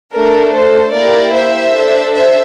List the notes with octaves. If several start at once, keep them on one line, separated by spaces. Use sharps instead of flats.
A3 D4 A4 A#4
A4 C5
A#3 E4 G4 A#4 D5
C5 E5
D4 A4
C5 E5